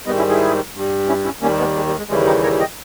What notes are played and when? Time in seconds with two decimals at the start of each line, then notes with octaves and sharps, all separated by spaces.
0.06 G#2 D#3 G3 B3 D#4
0.18 C#4 E4
0.29 E4 G#4
0.74 G2
0.79 G3
1.08 C#4 E4
1.24 C#4 E4
1.42 D#2 D#3 G3 A#3 C#4
1.59 G#3 B3
1.76 G#3
1.87 G3
1.98 G#3
2.09 D#2 C#3 E3 G3 G#3
2.26 D#4 G4
2.43 A#4 C#5
2.60 D#5 G5